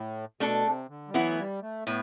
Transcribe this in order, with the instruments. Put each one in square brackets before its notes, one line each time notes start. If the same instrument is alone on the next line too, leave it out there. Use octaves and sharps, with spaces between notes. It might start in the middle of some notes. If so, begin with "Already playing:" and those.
Already playing: [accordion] A2
[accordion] B2 [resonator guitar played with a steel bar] A3 D4 A4
[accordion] C3
D3
G3
[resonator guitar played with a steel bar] E3 B3 E4 [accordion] F#3
[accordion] A3
G3
A3
[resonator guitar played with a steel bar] A2 [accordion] B3